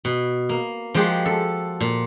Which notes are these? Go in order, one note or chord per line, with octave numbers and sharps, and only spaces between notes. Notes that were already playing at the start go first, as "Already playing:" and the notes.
B2
A#3
F3 G#3 F#4 G4
A4
A#2